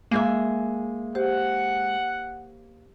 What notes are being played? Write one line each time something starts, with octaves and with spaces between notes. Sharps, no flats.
G#3 A#3 G#4 E5
G4 C5 F#5